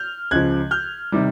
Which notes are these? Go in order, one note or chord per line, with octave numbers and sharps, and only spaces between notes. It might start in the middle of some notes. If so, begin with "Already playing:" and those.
Already playing: F6 G6
C#2 C#3 F3 F#6 G#6
F6 G6
C3 D#3 G3